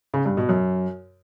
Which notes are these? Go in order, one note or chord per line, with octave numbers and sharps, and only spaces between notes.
C#3
G2
B2
F#2